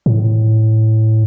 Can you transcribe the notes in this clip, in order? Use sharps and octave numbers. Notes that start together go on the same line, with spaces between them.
A2